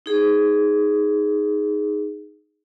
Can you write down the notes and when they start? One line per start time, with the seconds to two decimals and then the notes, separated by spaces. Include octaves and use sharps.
0.06 D#4 G#4